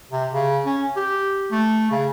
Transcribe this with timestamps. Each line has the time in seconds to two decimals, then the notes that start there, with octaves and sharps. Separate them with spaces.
0.11 C3
0.32 C#3
0.66 C#4
0.97 G4
1.51 A3
1.91 C#3